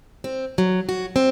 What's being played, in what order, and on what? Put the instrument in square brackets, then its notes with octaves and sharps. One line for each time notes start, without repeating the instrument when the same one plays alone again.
[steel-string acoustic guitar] C4
F#3
F#4
C4